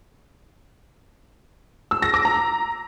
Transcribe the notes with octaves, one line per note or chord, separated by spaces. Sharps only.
E6
A#6
D6
A#5